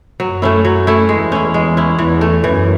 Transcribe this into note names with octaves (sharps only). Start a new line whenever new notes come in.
F#2 F#3
A3 C#4 E4
F#3
A3 C#4 E4
E2 G#3
C#4 E4
G#3
C#4 E4
E2 E3
A3 C#4
F#2 E3